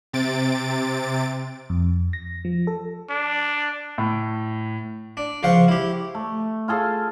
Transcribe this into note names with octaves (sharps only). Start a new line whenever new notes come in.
C3 A6 D7
F2
A#6
F3
A4
D4
A2
D4
C#2 F3 C5 F5 F#5 C#6
E4 G4
A3
F4 G#4 A4 F5